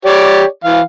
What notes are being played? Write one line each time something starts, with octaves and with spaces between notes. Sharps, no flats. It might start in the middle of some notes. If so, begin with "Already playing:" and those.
G4 C#5 D5
E3 F5